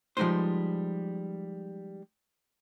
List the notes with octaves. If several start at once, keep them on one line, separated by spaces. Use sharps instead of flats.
F3 G3 G#3 D#4 B4 C5